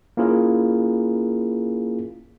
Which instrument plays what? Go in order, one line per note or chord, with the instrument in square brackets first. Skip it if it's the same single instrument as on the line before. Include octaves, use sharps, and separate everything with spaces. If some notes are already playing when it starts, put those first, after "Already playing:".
[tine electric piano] A#3 C#4 E4 F4 G#4 A#4